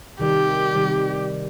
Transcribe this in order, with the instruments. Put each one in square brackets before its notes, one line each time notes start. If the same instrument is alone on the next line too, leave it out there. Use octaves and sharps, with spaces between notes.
[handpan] C3 D#3 G3 [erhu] G4
[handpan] C3 D#3 G3